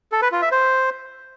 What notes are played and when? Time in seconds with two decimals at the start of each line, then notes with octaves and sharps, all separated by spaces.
0.12 A4
0.22 B4
0.32 F4
0.42 E5
0.52 C5